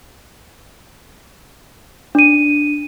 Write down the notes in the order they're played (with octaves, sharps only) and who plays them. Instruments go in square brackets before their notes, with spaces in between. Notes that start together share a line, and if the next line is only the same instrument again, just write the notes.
[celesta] D4 D#7